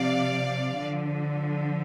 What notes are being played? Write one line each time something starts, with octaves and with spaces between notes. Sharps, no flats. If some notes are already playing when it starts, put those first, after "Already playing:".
Already playing: C3 F3 D5 F5
D3 F3